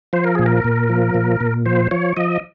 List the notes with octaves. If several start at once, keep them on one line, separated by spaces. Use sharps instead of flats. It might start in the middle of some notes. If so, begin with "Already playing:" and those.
F3 C5
A#4
A#2 G#4
A#4
A#2
F3
A#2
A#2
F3 C5
F3 C#5
F3 D#5